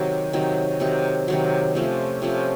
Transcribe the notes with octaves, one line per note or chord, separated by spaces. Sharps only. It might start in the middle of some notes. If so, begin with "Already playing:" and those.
Already playing: C3 D#3 F#3
C3 D#3 F#3
C3 D#3 F#3
C3 D#3 F#3
C3 F3 A3 C#4
C3 F3 A3 C#4